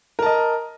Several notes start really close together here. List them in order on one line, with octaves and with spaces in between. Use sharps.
A#4 A5 D#5